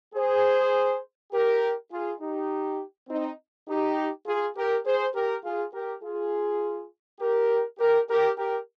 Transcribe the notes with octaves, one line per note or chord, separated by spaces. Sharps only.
G#4 C5
G4 A#4
F4 G#4
D#4 G4
C4 D#4
D#4 G4
F4 G#4
G4 A#4
G#4 C5
G4 A#4
F4 G#4
G4 A#4
F4 G#4
G4 A#4
G4 A#4
G4 A#4
G4 A#4